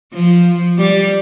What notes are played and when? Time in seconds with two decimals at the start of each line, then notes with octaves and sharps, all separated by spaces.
0.14 F3
0.78 G3